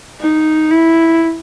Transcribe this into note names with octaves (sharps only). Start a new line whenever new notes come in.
D#4
E4